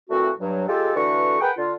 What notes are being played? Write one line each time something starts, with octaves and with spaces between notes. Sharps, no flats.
A#2 E3 A3 C4 F#4
G2 F#3
G#3 F4 G4 A4
D3 E3 A3 F#4 B4 C#6
G#4 A#4 B4 F#5 G5
D3 F4